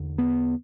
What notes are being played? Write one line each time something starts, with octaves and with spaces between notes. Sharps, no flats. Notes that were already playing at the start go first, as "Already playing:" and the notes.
Already playing: E2 D3
B3